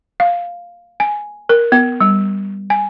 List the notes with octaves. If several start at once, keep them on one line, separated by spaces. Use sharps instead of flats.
F5
G#5
A#4
B3
G3
G#5